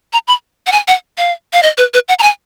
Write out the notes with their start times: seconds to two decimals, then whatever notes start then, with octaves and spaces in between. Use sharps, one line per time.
0.13 A#5
0.28 B5
0.67 F#5
0.72 G#5
0.88 F#5
1.18 F5
1.53 F5
1.63 D#5
1.78 B4
1.94 B4
2.09 F#5
2.19 A#5
2.23 G#5